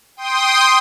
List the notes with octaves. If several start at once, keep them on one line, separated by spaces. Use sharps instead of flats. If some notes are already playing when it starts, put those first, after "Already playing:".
G5 C6 D#6